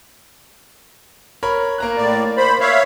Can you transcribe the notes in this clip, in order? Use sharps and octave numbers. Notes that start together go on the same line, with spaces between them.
A#4 C#5 B5
A#3 A#5 F#6
A2 D5
C5 B5
C#5 E5 F5